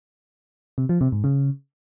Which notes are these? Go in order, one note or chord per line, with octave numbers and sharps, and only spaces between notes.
C3
F3
C3
G#2
C#3